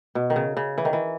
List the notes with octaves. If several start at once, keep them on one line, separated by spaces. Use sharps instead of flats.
B2
D#3
C#3
C#3
E3
D#3
E3